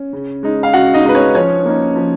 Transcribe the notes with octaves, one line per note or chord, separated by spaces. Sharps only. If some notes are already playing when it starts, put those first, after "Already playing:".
Already playing: C#4
C#3
G#3 D#4
F5
C#3 F#4 F#5
D#4 D#5
G#3 D#4 B4
C#4 C#5
F3 C#4 C#5
A#3 D#4
F3